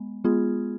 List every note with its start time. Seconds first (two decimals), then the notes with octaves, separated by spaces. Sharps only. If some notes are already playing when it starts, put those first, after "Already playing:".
Already playing: G#3 B3
0.24 G#3 B3 F4 G#4